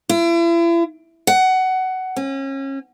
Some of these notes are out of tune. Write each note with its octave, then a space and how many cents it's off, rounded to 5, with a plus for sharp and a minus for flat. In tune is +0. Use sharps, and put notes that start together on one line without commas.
E4 +40
F#5 +15
C#4 -30